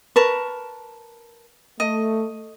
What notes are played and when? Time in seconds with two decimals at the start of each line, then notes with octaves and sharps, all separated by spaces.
0.16 A#4 B4 A5 C#6
1.80 A3 D#5